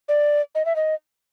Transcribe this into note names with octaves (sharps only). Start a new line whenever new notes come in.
D5
D#5
E5
D#5